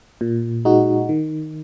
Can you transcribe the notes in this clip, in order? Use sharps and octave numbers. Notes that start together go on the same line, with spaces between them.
A#2
G#3 D#4 F#4
D#3